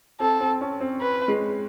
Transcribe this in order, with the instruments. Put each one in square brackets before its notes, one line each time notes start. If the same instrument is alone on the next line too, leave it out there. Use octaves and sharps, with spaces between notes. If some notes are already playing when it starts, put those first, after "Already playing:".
[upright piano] C4 [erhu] A4
[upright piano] C4
C#4
C4
[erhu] B4
[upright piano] G#3